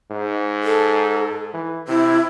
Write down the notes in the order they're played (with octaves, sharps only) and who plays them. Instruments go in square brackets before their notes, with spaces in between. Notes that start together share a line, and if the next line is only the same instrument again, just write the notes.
[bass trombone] G#2
[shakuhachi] A4
[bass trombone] E3
[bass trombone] C3 [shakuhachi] E4